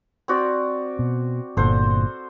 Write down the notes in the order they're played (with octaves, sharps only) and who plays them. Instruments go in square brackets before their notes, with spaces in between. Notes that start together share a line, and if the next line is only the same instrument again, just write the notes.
[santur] C4 F#4 D5
[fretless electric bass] B2
[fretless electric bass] G1 A#2 [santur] A4 C5 F#5